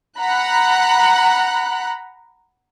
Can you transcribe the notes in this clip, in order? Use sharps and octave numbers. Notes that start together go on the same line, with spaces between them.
F#5 A#5 B5 F#6